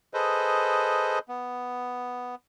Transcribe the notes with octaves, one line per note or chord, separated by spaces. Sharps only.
G#4 A4 B4 C5 D#5
B3